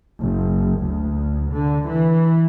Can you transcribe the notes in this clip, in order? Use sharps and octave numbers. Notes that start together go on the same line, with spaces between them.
F#1
D2
D3
E3